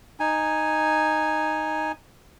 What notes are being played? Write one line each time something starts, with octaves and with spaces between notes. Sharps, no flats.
D#4 G#5